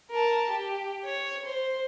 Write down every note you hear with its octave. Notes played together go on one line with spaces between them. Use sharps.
A#4 A5
G4
C#5
C5